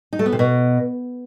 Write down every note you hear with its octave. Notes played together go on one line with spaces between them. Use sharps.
D#4
A3
B3
C3
B2